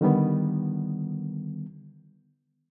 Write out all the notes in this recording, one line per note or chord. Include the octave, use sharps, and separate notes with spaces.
D3 D#3 G3 B3